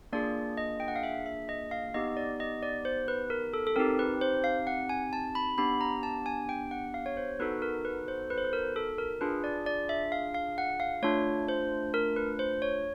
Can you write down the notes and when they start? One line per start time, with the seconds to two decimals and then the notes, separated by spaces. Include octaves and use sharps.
0.12 A#3 D4 F4 G#4 D5
0.57 D#5
0.80 G5
0.88 F#5
0.96 F5
1.03 E5
1.26 E5
1.49 D#5
1.71 F5
1.94 B3 D#4 G4 D#5
2.17 D5
2.40 D#5
2.63 D5
2.85 C5
3.08 B4
3.30 A#4
3.54 A4
3.67 A4
3.76 C4 D#4 G4 A#4
3.99 B4
4.21 C5
4.44 F5
4.67 F#5
4.89 G#5
5.13 A5
5.35 B5
5.58 B3 D4 G4 B5
5.81 A#5
6.03 A5
6.26 G#5
6.49 G5
6.71 F#5
6.94 F5
7.06 C#5
7.17 C5
7.39 B3 D#4 F#4 A4 B4
7.62 A#4
7.85 B4
8.08 C5
8.30 B4
8.38 C5
8.45 B4
8.53 A#4
8.76 A4
8.98 A#4
9.21 D4 F4 G#4 B4
9.44 D5
9.66 D5
9.89 E5
10.12 F5
10.34 F5
10.58 F#5
10.80 F5
11.02 A3 D4 F4 C#5
11.49 C5
11.94 A#4
12.16 B4
12.39 C5
12.62 C#5